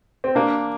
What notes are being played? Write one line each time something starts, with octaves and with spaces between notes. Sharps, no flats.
C4
A#3 D4